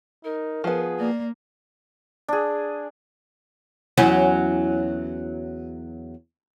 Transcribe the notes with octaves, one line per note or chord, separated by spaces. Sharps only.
D#4 A#4
F3 B3 G#4
A#3 D5
D4 G#4
E2 F#3 C#4